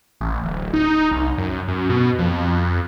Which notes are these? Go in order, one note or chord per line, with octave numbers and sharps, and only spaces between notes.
A1
D1
D#4
C2
F#2
F#2
B2
F2